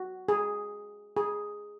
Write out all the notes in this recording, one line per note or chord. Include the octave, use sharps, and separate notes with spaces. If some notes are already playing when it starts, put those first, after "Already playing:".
Already playing: F#4
G#4
G#4